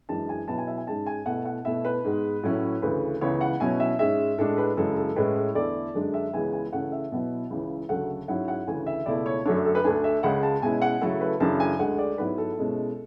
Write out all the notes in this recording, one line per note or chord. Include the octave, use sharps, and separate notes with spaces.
F#2 E3 G#3 D4 A5
G#5
B2 F#3 B3 E4 A5
G#5
E5
G#5
G#2 G#3 C#4 A5
G#5
B2 A3 E4 F#5
F#5
B2 A3 E4 E5
B4
G#2 G#3 B3
A2 F#3 C#4 E4
D2 C#3 E3 B4
C#2 C#3 E3 B3 C#5
F#5
B2 F#3 C#4 E4 G#5
E5
G#2 G#3 C#4 E5
A2 G#3 D4 A4
B4
F#2 C#3 E3 G#3 A4
A4
A2 G#3 C#4 E4 B4
C#5
E2 D3 A3 E4 D5
F#2 D3 G#3 D4
E5
C#2 C#3 E3 G#3 B3 G#5
G#5
C#3 E3 A3 C#4 F#5
E5
B2 F#3 B3 E4
C#2 C#3 E3
D2 C#3 F#3 A3 F#5
G#2 F#3 C#4 E4 F#5
F#5
D2 C#3 E3 G#5
E5
C#2 B2 A3 E4 D5
C#5
F#2 D3 F#3 A3 D4 C#5
A4
B4
D2 D3 A3 D4 G#5
E5
C#2 C#3 G#3 F#5
A5
B2 G#3 C#4 E4 G#5
F#5
C#3 F#3 A3 E4 A4
B4
F#2 C#3 E3 A3 D4 A5
G#5
D2 D3 G#3 F#5
D5
G#2 F#3 B3 E4 B4
A4
B2 G#3 C#4 E4